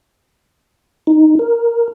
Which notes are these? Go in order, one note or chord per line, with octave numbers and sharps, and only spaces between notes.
D#4
A#4